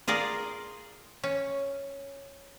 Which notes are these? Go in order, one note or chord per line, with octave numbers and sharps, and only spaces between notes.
F4 G#4 A#4 D5
C#4